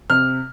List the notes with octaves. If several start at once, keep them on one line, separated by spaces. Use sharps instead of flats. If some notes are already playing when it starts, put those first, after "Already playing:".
C3 F6